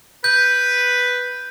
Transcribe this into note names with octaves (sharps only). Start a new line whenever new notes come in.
B4 G6